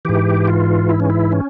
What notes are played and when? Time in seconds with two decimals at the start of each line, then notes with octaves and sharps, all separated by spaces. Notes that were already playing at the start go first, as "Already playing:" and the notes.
0.05 G#2 E3 G4
0.47 F4
0.89 E4
1.00 C#4
1.10 E4
1.32 C#4